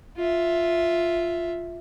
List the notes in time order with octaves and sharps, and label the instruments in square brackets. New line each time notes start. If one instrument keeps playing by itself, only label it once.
[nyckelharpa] F4 E5